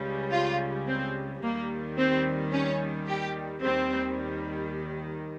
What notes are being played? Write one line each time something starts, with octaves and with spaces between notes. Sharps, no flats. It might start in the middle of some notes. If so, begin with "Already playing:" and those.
Already playing: C#2 C#3 G3
F4
C4
D#2 D#3 G3 A#3
C4
C#4
G4
D#2 D#3 G3 C4